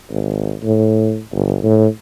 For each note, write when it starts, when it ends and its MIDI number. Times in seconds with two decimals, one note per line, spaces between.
0.11 0.55 32
0.63 1.20 45
1.32 1.58 31
1.63 1.88 45